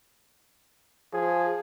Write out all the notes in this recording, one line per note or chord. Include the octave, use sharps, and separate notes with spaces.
F3 G#4